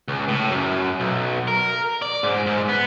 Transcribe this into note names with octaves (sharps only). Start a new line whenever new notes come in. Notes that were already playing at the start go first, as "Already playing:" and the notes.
C#2
A2
F#2
B1
A#4
D5
G#2
G#2
B3